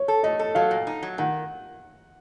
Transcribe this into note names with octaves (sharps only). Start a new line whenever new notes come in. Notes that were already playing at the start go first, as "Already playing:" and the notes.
Already playing: C#5
A4
A3 D#5
A4
F#3 F5
A#2
D#4
F#3
D#3 F#5